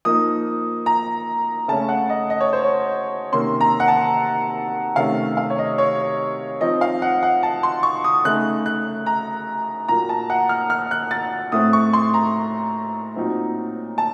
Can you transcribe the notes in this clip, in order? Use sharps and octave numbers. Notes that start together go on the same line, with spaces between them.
F3 A#3 D#4 D#6
A#5
C#3 A3 C#4 A5
F#5
D#5
D#5
C#5
C5
C#5
C3 D#3 A#3 C#4 C6
A#5
F#5
A5
C3 D#3 A3 C#4 F5
F5
C#5
D#5
C#5
F3 C4 D#4 D#5
F5
F#5
F#5
A5
C6
C#6
D#6
C#3 A3 D#4 F#6
F#6
A#5
A#2 F#3 A#3 A#5
A5
F#5
F6
F6
F#6
A6
A2 A3 C4 D#6
C#6
C6
A#5
A#2 F#3 C4 D#4
A5